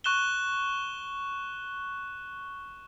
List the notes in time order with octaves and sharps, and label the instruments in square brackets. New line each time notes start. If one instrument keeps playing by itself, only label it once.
[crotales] C#6 F#6 E7 G7